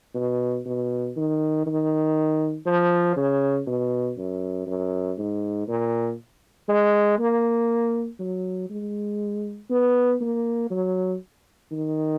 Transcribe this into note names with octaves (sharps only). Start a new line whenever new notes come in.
B2
B2
D#3
D#3
F3
C#3
B2
F#2
F#2
G#2
A#2
G#3
A#3
F#3
G#3
B3
A#3
F#3
D#3